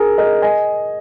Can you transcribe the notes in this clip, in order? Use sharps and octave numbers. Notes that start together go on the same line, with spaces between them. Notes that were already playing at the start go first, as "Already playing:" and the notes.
Already playing: G#4 A#4
A#4 D#5
D#5 G#5